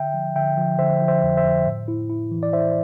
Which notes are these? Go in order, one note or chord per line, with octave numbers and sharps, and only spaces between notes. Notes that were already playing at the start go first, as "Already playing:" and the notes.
Already playing: D3 E5 G5
F3
D3 E5 G5
F3
D3 C5 E5
F3
C5 E5
F2
C5 E5
F2
A2
E4
E4
E3
D5
E4 C5 E5